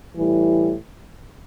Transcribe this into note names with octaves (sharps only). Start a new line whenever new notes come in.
A2 E3 G3 E4